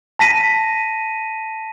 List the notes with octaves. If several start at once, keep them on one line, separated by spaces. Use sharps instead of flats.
A5 A#6 B6 D#7